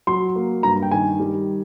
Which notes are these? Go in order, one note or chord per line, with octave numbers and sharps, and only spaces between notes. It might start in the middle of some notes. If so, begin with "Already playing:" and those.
F#3 C6
A#3
G2 A#5
G5
D#3 G#5
G3